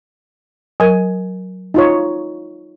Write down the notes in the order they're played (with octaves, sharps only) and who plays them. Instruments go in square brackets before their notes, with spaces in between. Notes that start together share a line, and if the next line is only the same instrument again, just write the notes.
[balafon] F#3 A#4 [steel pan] G#5
[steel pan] D#4 F4 C#5